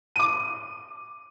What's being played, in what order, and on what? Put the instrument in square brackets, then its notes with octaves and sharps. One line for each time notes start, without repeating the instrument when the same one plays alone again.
[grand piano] D6 D#7